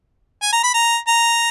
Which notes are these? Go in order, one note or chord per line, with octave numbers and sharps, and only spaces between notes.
G#5
A#5
B5
A#5
A#5